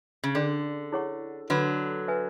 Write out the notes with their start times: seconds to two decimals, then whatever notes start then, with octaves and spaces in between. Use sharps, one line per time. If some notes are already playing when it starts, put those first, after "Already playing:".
0.24 C#3
0.35 D3 C#4 G#4 D5
0.92 E4 G#4 C#5 F#5 C#6
1.50 D3 F#3 B4 F#5 B5
2.08 B4 E5 G#5